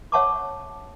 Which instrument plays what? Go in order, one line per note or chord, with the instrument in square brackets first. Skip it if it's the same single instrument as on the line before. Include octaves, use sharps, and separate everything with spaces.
[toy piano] C#5 E5 F#5 A5 C#6 D6